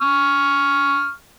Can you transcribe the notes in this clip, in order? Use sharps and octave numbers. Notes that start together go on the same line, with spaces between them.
C#6 F6